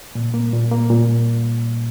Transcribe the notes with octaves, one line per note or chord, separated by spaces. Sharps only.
A#2
A#3
A#2
A#3
A#2